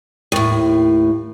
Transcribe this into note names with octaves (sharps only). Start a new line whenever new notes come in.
D#2 A2